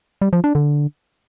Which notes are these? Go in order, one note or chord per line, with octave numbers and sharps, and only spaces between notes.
G3
F3
D4
D3